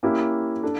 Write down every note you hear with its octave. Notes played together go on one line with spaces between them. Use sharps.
A#3 C#4 E4 G4
D4 A4